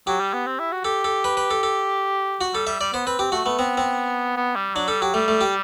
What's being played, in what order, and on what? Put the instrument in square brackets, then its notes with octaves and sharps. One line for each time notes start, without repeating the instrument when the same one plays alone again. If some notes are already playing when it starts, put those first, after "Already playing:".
[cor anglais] F#3 [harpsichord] G4
[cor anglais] G3
B3
C4
E4
F#4
[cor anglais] G4 [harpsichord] A4
[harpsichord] A4
B4
B4
A4
A4
F#4
[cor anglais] G3 [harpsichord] A4
[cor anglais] G3 [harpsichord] E5
[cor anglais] G3 [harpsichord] D5
[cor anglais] B3 [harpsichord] C5
[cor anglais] C4 [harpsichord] B4
[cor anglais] C4 [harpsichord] G4
[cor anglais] A3 [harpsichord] F#4
[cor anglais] A3 [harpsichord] B3
[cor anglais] B3 [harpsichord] C4
[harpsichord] C4
[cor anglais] B3
G3
[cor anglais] F#3 [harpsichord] D4
[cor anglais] G3 [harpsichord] A4
[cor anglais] F#3 [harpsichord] G4
[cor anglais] G3 [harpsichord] A3
[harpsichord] A3
G4